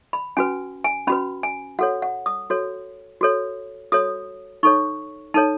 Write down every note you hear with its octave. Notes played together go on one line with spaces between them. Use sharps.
B5
C#4 F#4 B4 G#5
G#5
C#4 F#4 B4 B5
G#5
F#4 A4 C#5 F#5
F#5
D#6
F#4 A4 C#5
F#4 A4 C#5
F#4 A4 C#5 D#6
D#4 A4 C#5 C#6
D#4 A4 C#5 A5